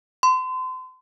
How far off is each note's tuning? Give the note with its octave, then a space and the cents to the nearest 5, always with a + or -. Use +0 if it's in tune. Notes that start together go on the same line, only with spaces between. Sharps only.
C6 -35